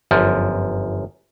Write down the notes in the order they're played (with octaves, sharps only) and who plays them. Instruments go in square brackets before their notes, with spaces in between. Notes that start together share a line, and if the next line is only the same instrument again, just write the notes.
[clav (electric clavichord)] G1 F#2 F3